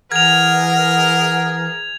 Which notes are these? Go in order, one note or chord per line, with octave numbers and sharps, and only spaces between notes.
E3 G#4 A#4 F#5 G#6 F7